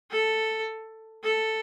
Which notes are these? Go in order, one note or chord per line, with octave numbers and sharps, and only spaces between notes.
A4
A4